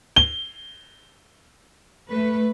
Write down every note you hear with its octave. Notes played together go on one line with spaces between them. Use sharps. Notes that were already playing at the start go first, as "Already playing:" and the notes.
G7
A3 B4